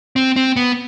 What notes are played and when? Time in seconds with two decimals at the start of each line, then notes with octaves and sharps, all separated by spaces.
0.16 C4
0.36 C4
0.56 B3